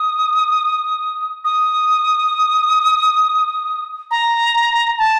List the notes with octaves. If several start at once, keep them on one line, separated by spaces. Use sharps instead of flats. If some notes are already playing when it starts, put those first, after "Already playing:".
Already playing: D#6
D#6
A#5
A5